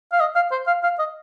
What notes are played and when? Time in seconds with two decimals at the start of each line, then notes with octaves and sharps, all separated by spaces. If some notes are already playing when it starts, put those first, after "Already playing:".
0.13 F5
0.20 D#5
0.36 F5
0.52 C5
0.67 F5
0.84 F5
0.99 D#5